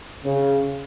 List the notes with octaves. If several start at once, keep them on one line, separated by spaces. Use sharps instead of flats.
C#3